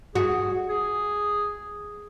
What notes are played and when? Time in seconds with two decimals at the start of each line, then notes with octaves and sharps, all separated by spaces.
0.15 F#4 G#4
0.70 G#4